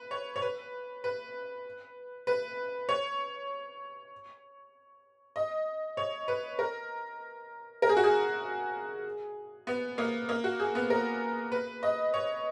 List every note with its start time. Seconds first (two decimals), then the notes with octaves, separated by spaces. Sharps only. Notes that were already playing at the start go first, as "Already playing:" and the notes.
Already playing: B4
0.11 C#5
0.36 C#5
0.42 B4
1.04 B4
2.27 B4
2.89 C#5
5.36 D#5
5.97 C#5
6.28 B4
6.59 A#4
7.82 A#4
7.89 G#4
7.97 F#4
8.04 G#4
9.67 B3
9.98 A#3
10.29 A#3
10.44 F#4
10.60 G#4
10.75 B3
10.90 A#4
11.52 B4
11.83 D#5
12.14 C#5